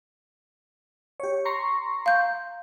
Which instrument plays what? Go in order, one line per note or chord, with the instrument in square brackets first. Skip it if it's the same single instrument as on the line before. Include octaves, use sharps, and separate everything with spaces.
[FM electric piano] G4 C#5
A#5 C6 C#6
[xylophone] F5 G6